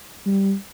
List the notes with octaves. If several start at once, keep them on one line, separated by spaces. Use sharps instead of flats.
G3